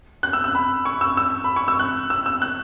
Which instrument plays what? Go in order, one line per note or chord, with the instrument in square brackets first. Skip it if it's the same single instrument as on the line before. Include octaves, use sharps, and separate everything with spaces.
[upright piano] F#6
E6
E6
B5
C#6
E6
E6
B5
C#6
E6
F#6
E6
E6
F#6